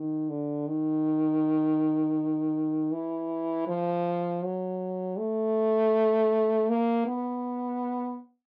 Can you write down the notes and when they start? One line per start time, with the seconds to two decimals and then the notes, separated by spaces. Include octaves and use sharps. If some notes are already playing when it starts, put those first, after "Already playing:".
Already playing: D#3
0.29 D3
0.67 D#3
2.93 E3
3.68 F3
4.43 F#3
5.18 A3
6.69 A#3
7.06 B3